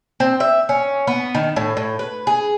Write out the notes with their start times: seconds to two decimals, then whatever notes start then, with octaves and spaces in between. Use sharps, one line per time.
0.20 C4
0.40 E5
0.69 C#4
1.07 B3
1.35 D#3
1.56 A2
1.77 A2
1.99 B4
2.27 G#4